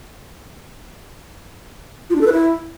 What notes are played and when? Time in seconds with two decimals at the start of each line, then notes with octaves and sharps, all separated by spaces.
2.10 F4
2.16 D4
2.21 A4
2.27 B4
2.32 E4